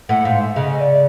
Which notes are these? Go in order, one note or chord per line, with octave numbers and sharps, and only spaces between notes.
A2 F#5
G#2 F5
E5
C#3 D#5
D#5
D5